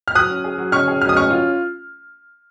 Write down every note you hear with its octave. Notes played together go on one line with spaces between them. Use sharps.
F6
F#3 D#6 F#6
C#4
G#4
F#3
C#4 C#6 F6
G#4
F#3 F6
D#6
C#4 C#6 F6
F4